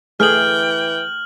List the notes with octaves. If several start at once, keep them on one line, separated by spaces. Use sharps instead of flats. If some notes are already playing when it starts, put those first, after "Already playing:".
E3 A3 G#4 G5 F6 F#7